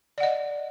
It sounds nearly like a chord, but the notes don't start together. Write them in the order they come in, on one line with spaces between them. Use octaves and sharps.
D5 F#5 D#5